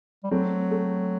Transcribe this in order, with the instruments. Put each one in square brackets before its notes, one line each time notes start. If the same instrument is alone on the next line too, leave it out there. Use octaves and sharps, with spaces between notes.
[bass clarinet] G3
[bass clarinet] F#3 [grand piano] A3 C4
[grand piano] A3